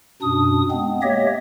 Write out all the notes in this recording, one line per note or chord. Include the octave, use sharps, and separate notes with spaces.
F#2 B2 D4 D#6
G#3 B3 C4
A#3 G4 C#5 D#5 E5